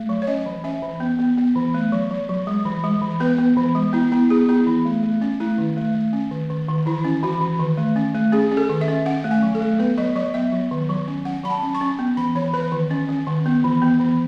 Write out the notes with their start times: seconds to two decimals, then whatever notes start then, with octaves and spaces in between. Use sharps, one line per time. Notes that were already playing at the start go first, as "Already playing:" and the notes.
Already playing: A3
0.09 F#3
0.22 C#5
0.27 C#4 D#5
0.46 E3
0.64 C#4 E5
0.82 E3
1.00 B3
1.19 B3
1.38 B3
1.56 E3
1.74 A3
1.92 F#3
2.11 F#3
2.29 F#3
2.47 G#3
2.65 E3
2.84 G#3
3.02 E3
3.20 B3 B4
3.38 B3
3.57 E3
3.75 G#3
3.93 B3 E4
4.12 B3 E4
4.30 B3 G#4
4.49 B3 E4
4.67 E3
4.85 A3
5.03 A3
5.21 C#4
5.40 A3 E4
5.58 D#3
5.77 A3
5.95 A3
6.13 C#4
6.31 D#3
6.50 D#3
6.68 D#3
6.86 E3 E4
7.04 C#4
7.23 E3 F#4
7.41 E3
7.59 D#3
7.78 A3
7.96 C#4
8.14 A3
8.32 C#4 G#4
8.51 C#4
8.57 A4
8.69 D#3
8.81 E5
8.88 C#4
9.06 C#4 F#5
9.24 A3
9.31 G#5
9.43 F#3
9.55 A4
9.61 A3
9.79 B3 B4
9.97 F#3 D#5
10.16 F#3 D#5
10.34 B3 E5
10.53 F#3
10.71 D#3
10.89 F#3
11.08 C#4
11.25 C#4 F#5
11.44 F#3 B5
11.50 A5
11.63 C#4
11.75 C#6
11.81 C#4
11.99 B3
12.17 E3 B5
12.35 E3 C#5
12.53 E3 B4
12.72 D#3
12.91 C#4
13.09 C#4
13.27 D#3
13.46 B3
13.64 E3
13.82 B3
14.00 E3